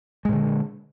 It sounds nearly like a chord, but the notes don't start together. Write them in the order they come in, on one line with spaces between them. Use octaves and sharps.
G#3 A#2 D3